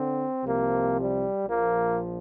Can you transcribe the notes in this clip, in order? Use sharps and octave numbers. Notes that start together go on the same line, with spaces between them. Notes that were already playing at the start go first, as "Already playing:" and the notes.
Already playing: D3 C4
C2 C3 F3 A#3
G3
A#1 A#2 F3 A#3